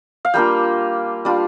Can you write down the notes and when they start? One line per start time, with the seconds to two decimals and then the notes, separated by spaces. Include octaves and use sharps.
0.25 F5
0.34 G3 A#3 D4 F4 G5
1.25 G3 D4 F4